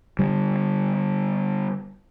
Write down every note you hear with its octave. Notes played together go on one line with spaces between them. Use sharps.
D3 G3